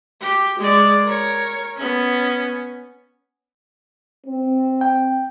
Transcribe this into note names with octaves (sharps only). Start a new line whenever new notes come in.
G4
G#3 D5
A#4 C#5
B3 C#4
C4
G5